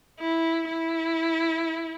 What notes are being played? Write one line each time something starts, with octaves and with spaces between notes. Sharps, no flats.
E4
E4